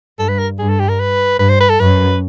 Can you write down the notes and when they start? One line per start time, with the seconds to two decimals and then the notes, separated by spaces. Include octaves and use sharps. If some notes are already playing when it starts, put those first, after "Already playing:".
0.19 G2 A4
0.29 B4
0.39 A#4
0.59 G2 G#4
0.69 A4
0.79 G4
0.89 A#4
1.00 B4
1.39 G2 B4
1.49 C5
1.60 B4
1.70 A4
1.80 F#2 B4